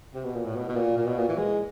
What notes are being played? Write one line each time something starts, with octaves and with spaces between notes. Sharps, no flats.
C3
B2
A#2
A2
B2
B2
A#2
A#2
B2
A#2
E3
G#3